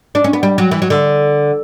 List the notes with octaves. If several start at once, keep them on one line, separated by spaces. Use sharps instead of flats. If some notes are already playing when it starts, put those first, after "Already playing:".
D4
C#4
B3
G3
F#3
E3
F#3
D3